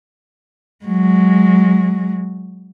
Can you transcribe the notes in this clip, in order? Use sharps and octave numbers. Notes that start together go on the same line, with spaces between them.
F#3 G#3